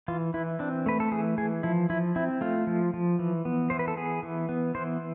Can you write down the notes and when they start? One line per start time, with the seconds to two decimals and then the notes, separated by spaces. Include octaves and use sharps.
0.08 E3 F4
0.34 E3 E4
0.59 C4 D4
0.86 A3 B4
1.00 A4
1.12 E3 G#4
1.38 E3 G#4
1.63 F3 E4
1.90 F3 E4
2.16 C4 E4
2.41 A3 F4
2.67 F3
2.94 F3
3.19 E3
3.45 B3
3.70 E3 C5
3.79 B4
3.88 A4
3.97 B3 G#4
4.23 E3
4.49 B3
4.75 E3 C5